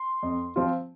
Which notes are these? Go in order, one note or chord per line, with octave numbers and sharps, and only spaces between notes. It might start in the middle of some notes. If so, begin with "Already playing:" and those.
Already playing: C6
F2
F3 C4 F4